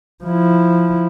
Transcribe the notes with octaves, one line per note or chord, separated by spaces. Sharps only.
F3 E4